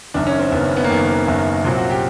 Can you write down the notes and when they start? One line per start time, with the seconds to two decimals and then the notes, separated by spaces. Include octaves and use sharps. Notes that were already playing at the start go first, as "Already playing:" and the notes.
0.14 F#1 F#2 D#3 D4
0.27 C#4
0.39 C4
0.52 F#1 F#2 D#3 B3
0.64 C4
0.77 B3
0.84 A#3
0.90 F#1 F#2 D#3 B3
1.27 F#1 F#2 D#3
1.65 C2 A#2 F#3 C4
1.77 F#4
1.90 G4